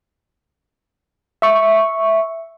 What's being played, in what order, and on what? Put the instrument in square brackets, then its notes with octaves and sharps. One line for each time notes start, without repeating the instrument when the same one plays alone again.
[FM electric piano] E5 C#6